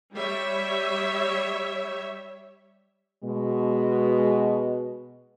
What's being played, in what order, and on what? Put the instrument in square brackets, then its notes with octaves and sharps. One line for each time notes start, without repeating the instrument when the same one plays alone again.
[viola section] G3 C#5 E5
[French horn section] B2 G#3